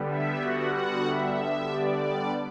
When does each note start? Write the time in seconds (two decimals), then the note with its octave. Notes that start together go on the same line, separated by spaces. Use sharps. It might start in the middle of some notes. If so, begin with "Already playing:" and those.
Already playing: D3 G3 B3
0.10 E5
0.42 F#4 F#5
0.73 F#4 F#5
1.06 E5
1.70 D5